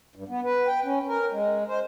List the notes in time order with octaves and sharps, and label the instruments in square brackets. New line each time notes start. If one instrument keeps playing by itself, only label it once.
[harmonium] G2
B3
B4
G5
C#4
A#4
G#3
C5